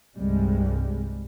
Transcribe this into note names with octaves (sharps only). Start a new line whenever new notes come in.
C2 G2 C3 G3 G#3